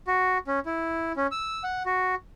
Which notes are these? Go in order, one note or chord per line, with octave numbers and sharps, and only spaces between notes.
F#4
C#4
E4
C#4
E6
F#5
F#4